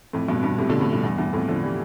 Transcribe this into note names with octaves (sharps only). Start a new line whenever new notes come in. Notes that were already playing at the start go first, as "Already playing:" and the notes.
F2 A2
G2 B2
G2 B2
A2 C3
B2 D3
A2 C3
G2 B2
E2 G2
E2 G2
F2 A2
D3 F3
E3 G3